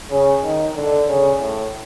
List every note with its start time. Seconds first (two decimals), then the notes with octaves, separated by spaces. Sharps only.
0.11 C#3
0.43 D#3
0.76 D3
1.08 C#3
1.40 A2